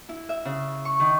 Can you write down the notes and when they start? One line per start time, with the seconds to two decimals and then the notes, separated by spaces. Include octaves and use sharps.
0.09 E4
0.29 E5
0.45 C#3
0.85 C#6
1.00 D#3